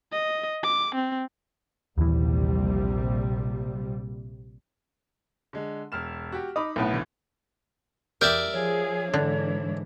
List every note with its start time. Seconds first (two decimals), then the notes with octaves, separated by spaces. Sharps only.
0.12 D#5
0.64 D6
0.95 C4
1.98 A#1 D#2 C3 E3 G3
5.53 D3 G#3
5.92 E1 F6 E7
6.32 F#4 G4
6.56 D#4 B5 D6 D#6
6.76 B1 A2 B3
6.91 D2 E3
8.21 E2 G4 A#4 D5 E5
8.52 F3 G#4 C#5
9.14 G#2 D3 E3 D4